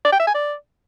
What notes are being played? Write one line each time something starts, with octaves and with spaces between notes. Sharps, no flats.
D5
G5
E5
G#5
D5